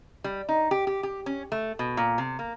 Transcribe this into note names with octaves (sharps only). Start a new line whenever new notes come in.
G3
D#4
G4
G4
G4
C#4
A3
B2
A#2
C3
A#3